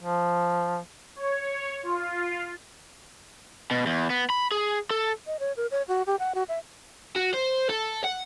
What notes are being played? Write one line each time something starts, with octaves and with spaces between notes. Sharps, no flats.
F3
C#5
F4
B2
E2
B3
B5
G#4
A4
D#5
C#5
A#4
C#5
F#4
G4
F#5
F#4
E5
F#4
C5
A4
F#5